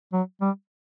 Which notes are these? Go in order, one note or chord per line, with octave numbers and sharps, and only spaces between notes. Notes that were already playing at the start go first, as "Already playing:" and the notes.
F#3
G3